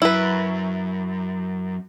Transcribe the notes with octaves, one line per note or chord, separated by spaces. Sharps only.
F#2 E4 B4